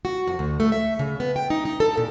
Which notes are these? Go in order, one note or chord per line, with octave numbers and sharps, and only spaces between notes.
F#4
F2
D2
A3
E5
C#3
B3
G5
D#4
D#4
A4
A#2